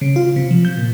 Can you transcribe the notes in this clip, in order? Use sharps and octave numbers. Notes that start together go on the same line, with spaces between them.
C#3
F4
C3
F3
G6
A#2